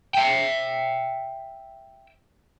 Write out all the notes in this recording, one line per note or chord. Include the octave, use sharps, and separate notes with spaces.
E5 G5